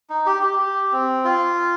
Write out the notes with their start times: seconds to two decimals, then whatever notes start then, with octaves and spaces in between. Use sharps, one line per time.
0.10 D#4
0.26 G4
0.43 G4
0.59 G4
0.92 C4
1.25 F4